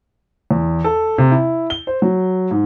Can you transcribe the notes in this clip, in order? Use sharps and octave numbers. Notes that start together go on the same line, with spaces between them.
E2
A4
C3
E4
G7
C5
F#3
G#2